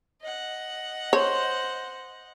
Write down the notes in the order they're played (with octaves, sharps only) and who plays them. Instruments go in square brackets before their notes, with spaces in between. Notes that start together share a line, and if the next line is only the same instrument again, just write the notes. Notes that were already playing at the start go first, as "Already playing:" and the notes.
[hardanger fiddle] D#5 F#5
[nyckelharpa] C5 [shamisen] C#5